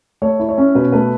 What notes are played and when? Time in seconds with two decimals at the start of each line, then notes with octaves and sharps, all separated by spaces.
0.22 A3 C#5
0.40 E4
0.49 C#5
0.58 C#4
0.75 B2 B4
0.92 A3 B4